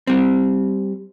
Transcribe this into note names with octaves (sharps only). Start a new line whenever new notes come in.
G3 C4